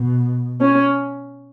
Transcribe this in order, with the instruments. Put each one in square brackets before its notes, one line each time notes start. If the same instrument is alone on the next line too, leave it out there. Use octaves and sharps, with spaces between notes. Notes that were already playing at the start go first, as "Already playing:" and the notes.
Already playing: [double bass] B2
[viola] C#4